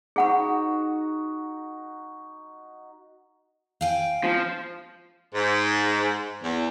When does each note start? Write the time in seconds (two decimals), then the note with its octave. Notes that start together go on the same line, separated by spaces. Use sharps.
0.16 D#4 F#4 G#4 F#5 B5
3.81 F5 G5 G#5
4.24 F3
5.34 G#2
6.42 E2